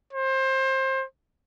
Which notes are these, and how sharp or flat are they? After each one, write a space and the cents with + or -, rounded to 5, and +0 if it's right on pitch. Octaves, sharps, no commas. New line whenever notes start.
C5 +25